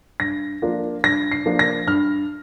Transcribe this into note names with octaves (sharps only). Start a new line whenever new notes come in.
G2 A#6
F3 A#3 D4 F4
G2 A#6
C7
F3 A#3 D4 F4
A#6
G2 F6